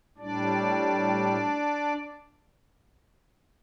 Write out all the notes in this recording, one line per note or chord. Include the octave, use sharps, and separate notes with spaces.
A2 G3 D4 D5